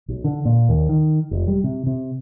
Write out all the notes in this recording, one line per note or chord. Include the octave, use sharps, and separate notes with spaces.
B1
D3
A#2
D#2
D#3
F1
G3
C3
C3